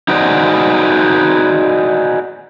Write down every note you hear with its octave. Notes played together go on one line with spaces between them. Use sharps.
D#4 F#4 G#4 C5 D5